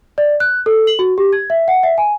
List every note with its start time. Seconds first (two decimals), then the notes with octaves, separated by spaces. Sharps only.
0.18 D5
0.40 F#6
0.66 A4
0.87 F#7
0.99 F#4
1.18 G4
1.33 G#6
1.50 E5
1.68 F#5
1.83 E5
1.98 G#5